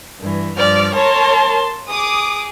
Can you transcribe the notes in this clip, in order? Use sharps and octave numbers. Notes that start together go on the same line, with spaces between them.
G2 E3
G2 F3 D5 F6
A#4 C#5 A5 C6
G#4 D6 D#6